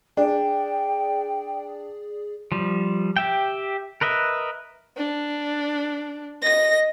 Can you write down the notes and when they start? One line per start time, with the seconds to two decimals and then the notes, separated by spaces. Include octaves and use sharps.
0.17 D4 G#4 D5 G5
2.52 F3 G3
3.16 G4 E5 G5
4.01 A#4 B4 D#5 E5
4.97 D4
6.42 D#5 A#6